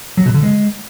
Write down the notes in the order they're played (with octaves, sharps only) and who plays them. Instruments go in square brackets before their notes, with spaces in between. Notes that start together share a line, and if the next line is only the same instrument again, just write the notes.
[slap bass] F#3
B2
D3
G#3